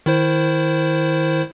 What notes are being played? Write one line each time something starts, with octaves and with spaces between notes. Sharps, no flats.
D#3 E4 C5